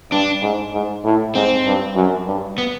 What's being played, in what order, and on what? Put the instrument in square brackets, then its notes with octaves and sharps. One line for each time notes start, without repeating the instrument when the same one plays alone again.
[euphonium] G2 [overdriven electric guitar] D4
[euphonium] G#2
G#2
A2
[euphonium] G#2 [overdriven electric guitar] C4
[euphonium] G2
F#2
G2
[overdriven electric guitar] B3